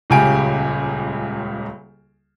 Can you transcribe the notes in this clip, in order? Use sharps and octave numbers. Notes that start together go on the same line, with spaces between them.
D#1 C#2 C#3 G4 G#5 D7